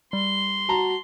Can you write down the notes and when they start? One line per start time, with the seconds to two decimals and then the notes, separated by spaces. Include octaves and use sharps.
0.13 G3 C6
0.69 F#4 A5 A#5